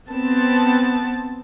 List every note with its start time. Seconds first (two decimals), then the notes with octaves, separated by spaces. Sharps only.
0.11 B3 C4 A5